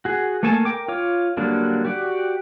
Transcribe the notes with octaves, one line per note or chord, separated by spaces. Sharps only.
F#4 G#4
A3 A#3 A4 G#5 A5
A#4 G5 D6
F4 C#5 D6
D3 F#3 G3 A#3 D4
F#4 G4 D5